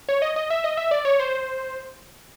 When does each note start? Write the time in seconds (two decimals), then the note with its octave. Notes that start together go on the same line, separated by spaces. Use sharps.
0.09 C#5
0.22 D#5
0.36 D#5
0.50 E5
0.64 D#5
0.77 E5
0.91 D5
1.05 C#5
1.20 C5